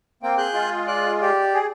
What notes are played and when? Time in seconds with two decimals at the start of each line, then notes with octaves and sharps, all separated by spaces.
0.23 A#3 C4 G5
0.38 G#4 F#6 G6
0.54 G#3 F4
0.87 D5 F#6
1.21 G4 D5
1.54 G#4